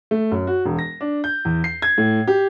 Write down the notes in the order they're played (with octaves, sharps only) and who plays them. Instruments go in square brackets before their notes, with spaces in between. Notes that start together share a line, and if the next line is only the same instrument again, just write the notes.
[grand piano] A3
F#2
F#4
E1
A#6
D4
G6
E2
C7
G#6
A2
G4